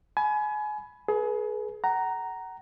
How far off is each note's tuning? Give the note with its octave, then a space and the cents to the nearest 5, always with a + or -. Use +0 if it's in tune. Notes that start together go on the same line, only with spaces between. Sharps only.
G#5 +30 B5 +0
G#4 +30 B4 -30
F#5 +30 A#5 +0